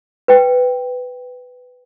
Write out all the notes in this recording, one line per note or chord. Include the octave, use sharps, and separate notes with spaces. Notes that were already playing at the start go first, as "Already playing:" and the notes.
B4 G5